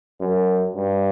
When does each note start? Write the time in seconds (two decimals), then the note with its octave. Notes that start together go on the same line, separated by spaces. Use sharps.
0.20 F#2
0.76 G2